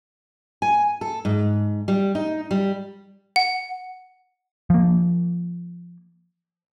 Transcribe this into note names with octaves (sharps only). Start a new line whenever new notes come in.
G#5
A4
G#2
G3
D#4
G3
F#5
F3 A#3